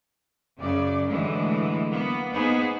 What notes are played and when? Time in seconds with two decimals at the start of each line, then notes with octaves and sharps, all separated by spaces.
0.58 F#2 C#3 D5
1.08 A2 D3 E3 F#3 G#3 A3
1.90 A#3 B3
2.32 A#3 B3 D#4 G#4 B4 C5